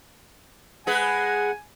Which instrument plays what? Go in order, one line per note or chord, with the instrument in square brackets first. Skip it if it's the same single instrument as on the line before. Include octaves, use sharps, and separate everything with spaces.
[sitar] G#3 G#4 B4 [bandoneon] F#5 [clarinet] G#5